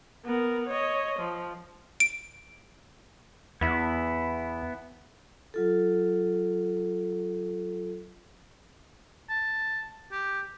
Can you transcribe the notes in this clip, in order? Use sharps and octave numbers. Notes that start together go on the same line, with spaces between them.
B3 A#4
C#5 D#5
F3
D7
E2 B3 E4
F#3 F4 A4
A5
G4